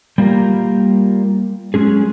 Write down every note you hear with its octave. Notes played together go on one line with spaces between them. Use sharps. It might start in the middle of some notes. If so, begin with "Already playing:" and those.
G3 A#3 F4 G4 A#4
F#3 G#3 C#4 G#4